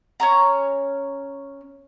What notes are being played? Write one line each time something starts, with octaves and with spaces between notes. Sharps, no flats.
C#4 C#5 A#5